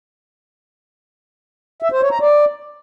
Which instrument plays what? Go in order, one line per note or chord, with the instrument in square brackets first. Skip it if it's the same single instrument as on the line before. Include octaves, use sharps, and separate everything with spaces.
[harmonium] E5
C5
C#5
A#5
D5